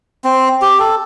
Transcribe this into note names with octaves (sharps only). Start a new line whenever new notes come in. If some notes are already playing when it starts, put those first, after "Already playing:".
C4
G4
A4